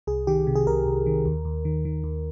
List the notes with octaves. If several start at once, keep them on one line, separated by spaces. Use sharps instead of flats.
C2 G#4
D#3 G4
C3
G#4
C2 A#4
C2
D#3
D#2
D#2
D#3
D#3
D#2